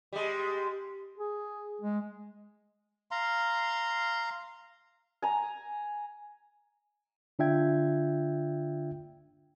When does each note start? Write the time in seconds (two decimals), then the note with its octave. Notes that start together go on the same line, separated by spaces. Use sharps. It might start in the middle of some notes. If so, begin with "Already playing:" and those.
0.13 G3 G#3
1.18 G#4
1.81 G#3
3.11 F5 A#5 C6
5.22 G#5 A#5
7.39 D3 D4 F4 E5 G5 G#6